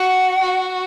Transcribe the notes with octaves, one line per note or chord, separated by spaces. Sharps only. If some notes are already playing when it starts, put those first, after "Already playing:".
Already playing: F#4 F#5
F#4